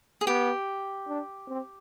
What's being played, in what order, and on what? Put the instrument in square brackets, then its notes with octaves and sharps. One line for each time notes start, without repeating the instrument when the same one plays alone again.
[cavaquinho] G#4
[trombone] B3 [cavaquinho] G4
[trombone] D4
C4